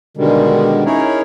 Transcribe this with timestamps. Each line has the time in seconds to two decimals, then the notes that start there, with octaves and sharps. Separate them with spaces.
0.17 B2 D3 D#3 G3 G#3
0.85 C#4 D#4 E4 G#4 A#4 C#5